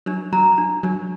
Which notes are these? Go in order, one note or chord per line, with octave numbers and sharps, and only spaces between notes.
F#3 D4
F#3 A#5
D4
F#3 D4